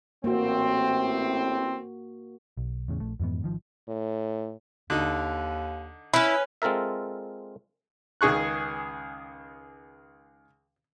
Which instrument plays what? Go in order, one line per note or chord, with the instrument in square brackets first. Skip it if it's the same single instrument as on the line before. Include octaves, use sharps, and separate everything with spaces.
[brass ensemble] A1 A2 C4 [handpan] A#3 F#4
[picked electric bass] B1
E2 A2 C#3
A#1 A3
F2 G#2 E3 B3
G#1 D#3 F3
[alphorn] A2
[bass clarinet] D#2 [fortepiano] D3 D#4
[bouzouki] C#4 B4 [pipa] E4
[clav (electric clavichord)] G#3 C4 F4 A4 A#4 E5
[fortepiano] C#2 D#3 G#4 C#6 F#6